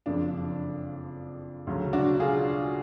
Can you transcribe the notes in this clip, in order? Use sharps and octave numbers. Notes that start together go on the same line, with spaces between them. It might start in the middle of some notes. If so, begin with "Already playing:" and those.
F#1 F2 C#3 F3 D4
D2 C#3 F#3
D4 F#4
F4 G#4